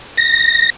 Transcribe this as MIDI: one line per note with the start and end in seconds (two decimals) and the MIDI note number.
0.17 0.70 94